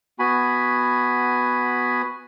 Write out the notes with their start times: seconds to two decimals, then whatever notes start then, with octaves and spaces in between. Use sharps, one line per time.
0.19 B3 F#4 G#5 B5